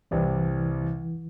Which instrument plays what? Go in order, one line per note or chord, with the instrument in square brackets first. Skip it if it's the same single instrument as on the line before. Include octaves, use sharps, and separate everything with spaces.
[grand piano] C2 C3 G3 [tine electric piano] E3